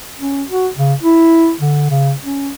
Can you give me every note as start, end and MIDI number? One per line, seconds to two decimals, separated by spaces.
0.19 0.44 61
0.49 0.68 66
0.76 0.94 49
1.03 1.53 64
1.61 1.90 50
1.91 2.13 49
2.25 2.51 61